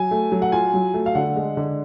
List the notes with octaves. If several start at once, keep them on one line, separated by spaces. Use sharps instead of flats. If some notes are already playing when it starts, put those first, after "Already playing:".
Already playing: F#3 G#5
A3
F#3
F#5
F4 G#5
F#3
A3
F5
D3 F#5
G#3
D3